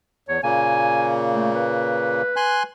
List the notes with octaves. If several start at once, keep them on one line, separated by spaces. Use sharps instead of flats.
E2 C#5
A#2 C#3 A#3 G#5
A3
B4
G#5 C6 F#6